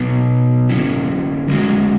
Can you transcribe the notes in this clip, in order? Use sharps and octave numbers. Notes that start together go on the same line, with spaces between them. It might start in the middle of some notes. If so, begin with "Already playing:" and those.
Already playing: B2 F#3 B3
D3 F#3 C#4 E4
D3 G#3 C#4 F#4